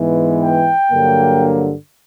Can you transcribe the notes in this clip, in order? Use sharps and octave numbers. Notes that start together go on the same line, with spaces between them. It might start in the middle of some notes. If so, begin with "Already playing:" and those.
Already playing: G#2 E3 G#3 B3
G5
G2 D3 F#3 A#3